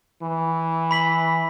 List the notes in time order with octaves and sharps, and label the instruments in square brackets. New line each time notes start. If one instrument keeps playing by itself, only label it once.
[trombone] E3
[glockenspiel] B5 B6 F#7